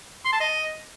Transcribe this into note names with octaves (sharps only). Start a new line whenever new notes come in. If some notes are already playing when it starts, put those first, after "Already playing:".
C6
A5
D#5